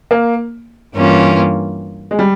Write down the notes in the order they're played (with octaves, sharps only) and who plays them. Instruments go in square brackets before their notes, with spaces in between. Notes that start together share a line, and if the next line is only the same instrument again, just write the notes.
[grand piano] A#3
[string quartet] G2 E3 A#3 C#4 F4
[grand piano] G#3
G3